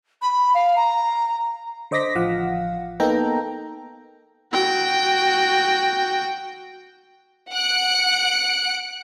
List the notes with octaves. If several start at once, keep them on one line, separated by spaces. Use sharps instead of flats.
B5
F5
A#5
D3 C5 D#5 D6 A#6 B6
A1 F3 F5 F#5
A#3 B3 D#4 A4 G5 A#5
F#4 G5
F#5 F#6 C#7 D7